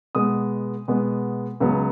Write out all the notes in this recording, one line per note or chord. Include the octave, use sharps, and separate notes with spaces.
B2 G#3 B3 D#6
B2 G#3 B3
C#2 C#3 F#3 B3